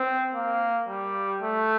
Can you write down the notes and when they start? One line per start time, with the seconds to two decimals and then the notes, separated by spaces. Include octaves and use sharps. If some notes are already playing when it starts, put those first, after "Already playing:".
Already playing: C4
0.34 A#3
0.89 G3
1.42 A3